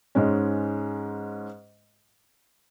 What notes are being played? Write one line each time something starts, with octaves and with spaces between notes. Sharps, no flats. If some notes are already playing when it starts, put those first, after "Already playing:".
G#2 G#3 C#4